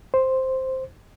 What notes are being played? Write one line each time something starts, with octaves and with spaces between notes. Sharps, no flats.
C5